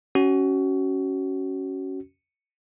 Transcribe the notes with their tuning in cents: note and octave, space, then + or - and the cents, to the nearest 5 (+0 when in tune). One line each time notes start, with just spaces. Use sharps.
C#4 +0 F#4 +25